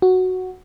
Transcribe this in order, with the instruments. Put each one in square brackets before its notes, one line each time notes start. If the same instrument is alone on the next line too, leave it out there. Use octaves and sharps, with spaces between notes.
[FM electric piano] F#4